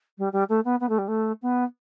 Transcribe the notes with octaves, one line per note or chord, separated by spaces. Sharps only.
G3
G3
A3
B3
B3
A3
G3
A3
B3